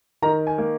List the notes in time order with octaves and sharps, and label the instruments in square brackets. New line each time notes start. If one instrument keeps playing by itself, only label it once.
[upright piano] D#3 A#5
G#5
A#3